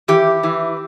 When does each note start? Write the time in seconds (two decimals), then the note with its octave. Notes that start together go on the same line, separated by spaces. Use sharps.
0.08 E3 G4
0.43 E3